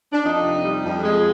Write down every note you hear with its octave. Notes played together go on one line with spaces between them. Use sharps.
D4
F2 D#4
C3
G3
F2
G#3